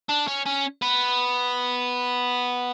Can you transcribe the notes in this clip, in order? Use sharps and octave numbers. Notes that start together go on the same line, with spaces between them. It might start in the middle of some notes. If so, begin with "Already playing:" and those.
D4
C#4
C#4
B3